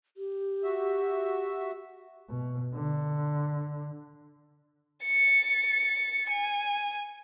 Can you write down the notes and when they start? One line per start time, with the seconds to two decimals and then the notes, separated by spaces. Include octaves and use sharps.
0.17 G4
0.63 F#4 E5
2.29 B2
2.75 D3
5.04 A6 C#7
6.30 G#5